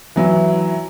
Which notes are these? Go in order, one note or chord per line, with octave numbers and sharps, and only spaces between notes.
E3 F#3 E4